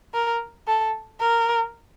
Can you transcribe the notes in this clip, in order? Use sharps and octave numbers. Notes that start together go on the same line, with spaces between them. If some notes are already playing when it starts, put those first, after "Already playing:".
A#4
A4
A#4